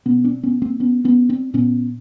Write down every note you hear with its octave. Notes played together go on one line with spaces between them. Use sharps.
B2 B3 C#4
C4 D4
B3 C#4
A#3 C4
B3 C#4
B3 C#4
C4 D4
A#2 B3 C#4